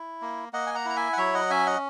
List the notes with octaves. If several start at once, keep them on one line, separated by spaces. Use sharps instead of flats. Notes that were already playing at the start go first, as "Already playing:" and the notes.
Already playing: E4
A#3
A#3 D#5 F#5
G#5
F#5 A#5
E4 A#5
E5 G#5
F#5
F#3 C#5 E5
D#5 F#5
C#4 E5 G#5
D#5 F#5